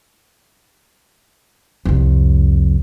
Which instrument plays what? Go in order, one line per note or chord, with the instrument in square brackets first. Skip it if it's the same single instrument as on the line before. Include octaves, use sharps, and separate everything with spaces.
[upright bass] C2 F2